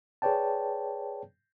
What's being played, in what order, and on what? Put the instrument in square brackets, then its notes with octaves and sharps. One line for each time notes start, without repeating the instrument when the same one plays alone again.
[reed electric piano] G#4 B4 C#5 D5 G5 A5